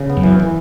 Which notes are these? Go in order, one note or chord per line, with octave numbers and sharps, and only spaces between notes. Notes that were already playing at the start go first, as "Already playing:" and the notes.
Already playing: C#3
B3
F#2
E3
E3